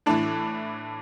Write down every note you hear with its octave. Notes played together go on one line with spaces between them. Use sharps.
A2 E3 D4